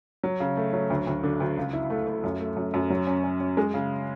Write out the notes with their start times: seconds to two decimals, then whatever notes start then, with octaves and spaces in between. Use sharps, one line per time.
0.24 F#3
0.40 C#3
0.57 A3
0.73 F#3
0.90 D2
1.07 D2
1.23 D3
1.40 D2
1.57 C#2
1.73 E4
1.90 A3
2.07 A3
2.24 F#2
2.40 A3
2.57 F#2
2.74 F#2
2.90 F#3
3.07 C#4
3.24 C#4
3.40 C#4
3.57 G#3
3.74 C#3